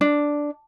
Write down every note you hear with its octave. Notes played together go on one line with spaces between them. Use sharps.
D4